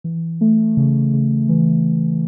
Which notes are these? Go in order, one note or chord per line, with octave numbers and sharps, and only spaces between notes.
E3
A3
C#3
C#3
E3